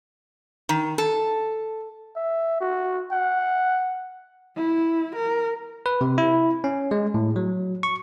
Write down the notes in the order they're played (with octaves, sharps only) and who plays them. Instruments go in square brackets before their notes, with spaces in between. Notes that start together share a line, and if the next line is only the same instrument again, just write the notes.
[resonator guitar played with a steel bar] D#3
A4
[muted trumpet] E5
F#4
F#5
[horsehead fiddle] E4
A#4
[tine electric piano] B4
C3
E4
C#4
G#3
A2
F#3
C#6